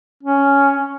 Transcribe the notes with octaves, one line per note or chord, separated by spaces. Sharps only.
C#4